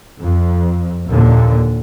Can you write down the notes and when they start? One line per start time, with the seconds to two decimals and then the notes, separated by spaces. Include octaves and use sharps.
0.20 F2
1.08 D#2 A#2 D3